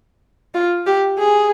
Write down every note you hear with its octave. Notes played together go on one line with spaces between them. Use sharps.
F4
G4
G#4